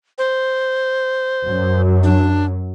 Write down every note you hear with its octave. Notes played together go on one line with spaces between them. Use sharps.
C5
F#2 F#3
D4